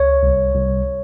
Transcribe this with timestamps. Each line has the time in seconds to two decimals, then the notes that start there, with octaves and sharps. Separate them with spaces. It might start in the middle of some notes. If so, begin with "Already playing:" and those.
Already playing: C#2 C#5
0.23 C2
0.54 C2